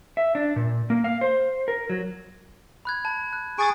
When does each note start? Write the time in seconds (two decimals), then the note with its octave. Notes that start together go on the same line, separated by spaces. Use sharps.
0.17 E5
0.35 D4
0.56 A#2
0.90 A#3
1.04 F5
1.21 C5
1.68 A#4
1.90 F#3
2.85 B5 F#6 G#6
3.05 A5
3.33 F#6
3.58 G#4 G#5 C#6 D#6 A6 D7